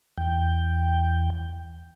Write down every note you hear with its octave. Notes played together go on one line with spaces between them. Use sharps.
E2 G5